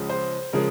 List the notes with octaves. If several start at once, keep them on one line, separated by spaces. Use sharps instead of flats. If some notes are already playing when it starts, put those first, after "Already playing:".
Already playing: C#2 C#3 F3 G#3
C5
C#3 F3 G#3 A#4